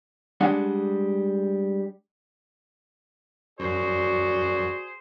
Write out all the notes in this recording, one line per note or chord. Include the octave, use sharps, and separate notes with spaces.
G3 G#3 D4 F#5
F#2 F#4 G#4 C5 D5